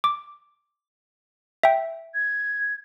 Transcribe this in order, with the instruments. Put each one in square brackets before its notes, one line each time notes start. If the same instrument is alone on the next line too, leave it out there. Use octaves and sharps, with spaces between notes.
[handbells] D6
E5 G5
[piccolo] G#6